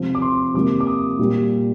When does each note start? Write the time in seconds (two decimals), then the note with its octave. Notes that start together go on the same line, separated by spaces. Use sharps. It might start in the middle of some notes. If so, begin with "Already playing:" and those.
Already playing: C3 F3 C4
0.15 D6
0.22 C6
0.54 C3 F3 A#3 D6
0.80 D6
0.87 D#6
1.19 A#2 G3 A#3